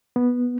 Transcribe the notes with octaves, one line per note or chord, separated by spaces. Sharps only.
B3